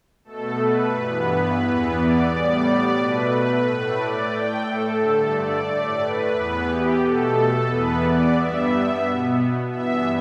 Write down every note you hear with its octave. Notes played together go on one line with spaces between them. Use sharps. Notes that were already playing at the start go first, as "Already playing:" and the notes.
B2 A3 A4
B4
G2 E3 B3
E2 E3 B3
D5
A2 G3 B3
B2 A3 B4
A2 A3
D5
A2 A3 G5
A4
G2 D3 A3
D5
A2 A3
B4
E2 E3 B3
G4
B2 A3 A4
E2 E3 B3 B4
D5
G2 G3 B3 E5
B2 B3
G2 E3 B3 E5